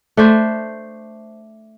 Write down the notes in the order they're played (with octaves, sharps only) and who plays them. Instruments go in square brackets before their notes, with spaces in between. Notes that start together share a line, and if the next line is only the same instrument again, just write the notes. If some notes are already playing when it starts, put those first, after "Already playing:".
[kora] A3 D4 C5